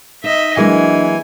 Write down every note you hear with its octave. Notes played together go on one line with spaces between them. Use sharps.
D#4 D#5 E5
E3 F#3 G#3 A#3 D4 D#5 G#5